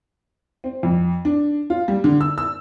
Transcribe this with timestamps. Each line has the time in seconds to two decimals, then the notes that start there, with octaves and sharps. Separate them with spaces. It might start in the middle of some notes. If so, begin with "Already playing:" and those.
0.64 C4
0.83 F2
1.25 D4
1.70 F4
1.88 G3
2.04 D3
2.21 E6
2.38 E6